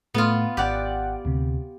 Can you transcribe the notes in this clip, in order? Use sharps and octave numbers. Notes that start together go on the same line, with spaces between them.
A2 A3 B3 F4
G#1 G4 D5 F#5 G5
D2 C3